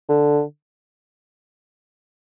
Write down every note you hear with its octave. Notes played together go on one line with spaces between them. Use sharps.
D3